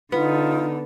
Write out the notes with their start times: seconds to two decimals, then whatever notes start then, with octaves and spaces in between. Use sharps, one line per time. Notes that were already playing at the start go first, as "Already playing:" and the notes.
0.12 D3 B3 D#4 F4